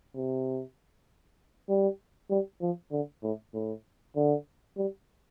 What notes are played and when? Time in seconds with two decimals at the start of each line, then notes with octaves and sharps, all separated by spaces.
0.15 C3
1.69 G3
2.30 G3
2.61 F3
2.92 D3
3.23 A2
3.54 A2
4.16 D3
4.77 G3